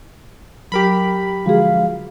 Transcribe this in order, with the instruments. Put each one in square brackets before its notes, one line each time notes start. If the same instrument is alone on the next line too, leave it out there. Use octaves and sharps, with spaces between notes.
[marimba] F#3 [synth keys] G4 A#4 B5
[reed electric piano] D3 F3 G#3 [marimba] F#4 G#4 [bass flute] F5